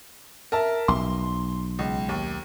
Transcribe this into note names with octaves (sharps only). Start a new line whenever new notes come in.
A#4 E5 A5
B1 C6
C#2
D#2